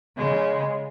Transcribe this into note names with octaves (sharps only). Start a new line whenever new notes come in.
C#3 G#3